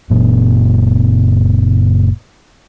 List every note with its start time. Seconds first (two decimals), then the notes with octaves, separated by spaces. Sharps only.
0.10 F#1 A#2